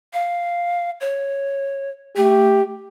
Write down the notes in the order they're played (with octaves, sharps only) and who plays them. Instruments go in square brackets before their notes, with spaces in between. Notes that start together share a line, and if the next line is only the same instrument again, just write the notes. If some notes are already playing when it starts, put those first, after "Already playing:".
[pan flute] F5
C#5
[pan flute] A3 [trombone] G4